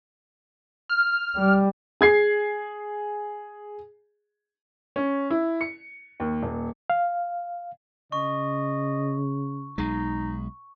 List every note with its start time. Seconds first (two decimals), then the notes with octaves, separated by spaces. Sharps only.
0.89 F6
1.36 G3
2.01 G#4 G#6 C7
4.96 C#4
5.30 E4
5.61 C#7
6.20 D#2
6.43 D#1
6.90 F5
8.12 C#3 D#5 C#6
9.78 B1 G#3 D#4